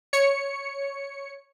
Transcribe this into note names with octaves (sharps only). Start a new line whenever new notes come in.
C#5 C#7